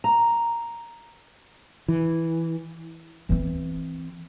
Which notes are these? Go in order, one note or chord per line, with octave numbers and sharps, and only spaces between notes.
A#5
E3
E3 C4